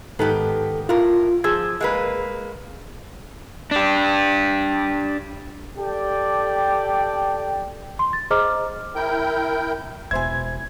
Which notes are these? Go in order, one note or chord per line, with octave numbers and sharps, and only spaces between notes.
G#2 D#3 B3 G4 A4
A2 F4 A#4
F3 G#4 E6 G#6
G#3 A#3 B4
D4 G4
G4 A4 D5 G5
C6
A6
G#4 C5 D#5 A#5 D6 F6
E4 A#4 G5 G6
E1 B2 E4 C5 G#5 E6 G#6